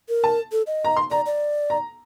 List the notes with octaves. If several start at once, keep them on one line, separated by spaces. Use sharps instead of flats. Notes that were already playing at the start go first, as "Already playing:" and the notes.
A#4
A5
A4
D#5
A#5
C6
D5 A#5
D5
A#5